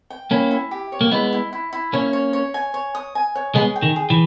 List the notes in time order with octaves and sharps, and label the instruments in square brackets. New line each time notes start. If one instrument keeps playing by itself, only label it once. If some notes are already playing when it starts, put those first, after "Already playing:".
[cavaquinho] G5
[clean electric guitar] A#3 C#4 [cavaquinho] E4
[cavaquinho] E4
G4
C#5
[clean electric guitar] A#3
[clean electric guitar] G#3 B3 [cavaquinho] E4
[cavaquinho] E4
E4
E4
[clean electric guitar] A#3 C#4 [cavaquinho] C#5
[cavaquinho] C#5
C#5
G#5
C#5
D#6
G#5
C#5
[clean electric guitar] G#3 B3 [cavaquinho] G#4
[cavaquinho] G5
[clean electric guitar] D#3
[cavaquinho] G#4
[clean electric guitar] E3